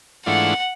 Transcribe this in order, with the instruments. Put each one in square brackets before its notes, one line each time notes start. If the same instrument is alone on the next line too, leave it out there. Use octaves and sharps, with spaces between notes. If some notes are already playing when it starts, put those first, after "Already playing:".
[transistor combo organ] G#2 E3 A3 D4 F4 [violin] F#5